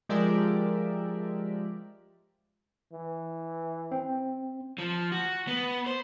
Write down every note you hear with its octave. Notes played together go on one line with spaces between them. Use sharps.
F3 G#3 G4 A#4 D5 E5
E3
C4
F3
F#4
B3
C5